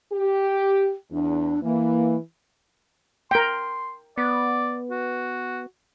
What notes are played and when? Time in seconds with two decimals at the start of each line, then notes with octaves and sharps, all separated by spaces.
0.13 G4
1.11 E2 D4
1.63 E3 A#3
3.31 A#4 G5 C6
4.18 B3 D5
4.91 F#4